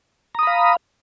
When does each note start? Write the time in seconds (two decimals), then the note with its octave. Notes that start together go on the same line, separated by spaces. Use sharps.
0.35 A#5
0.39 D#6
0.43 B5
0.47 F5